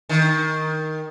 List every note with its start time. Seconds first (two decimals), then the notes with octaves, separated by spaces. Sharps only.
0.09 D#3